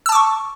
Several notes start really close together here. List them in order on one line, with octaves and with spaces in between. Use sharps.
E6 A5 D6 C#6